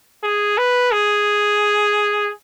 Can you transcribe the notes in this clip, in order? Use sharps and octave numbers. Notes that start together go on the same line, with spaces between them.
G#4
B4
G#4